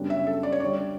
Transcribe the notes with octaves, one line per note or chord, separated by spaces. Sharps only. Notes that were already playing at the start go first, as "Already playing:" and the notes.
Already playing: F#2 C#3 G3 B3 D4
E5
A4
D5
C#5
D2 D3 G3 D5